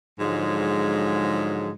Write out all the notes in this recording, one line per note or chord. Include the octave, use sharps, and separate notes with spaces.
G#2 D3 F3 F#3 G#3